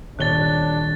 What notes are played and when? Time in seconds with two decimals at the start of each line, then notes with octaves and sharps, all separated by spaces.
0.19 D#1 D4 C#5 F#6 A6 G7